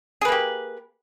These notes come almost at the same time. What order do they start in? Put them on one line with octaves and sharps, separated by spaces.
G#4 B4 A#3 G4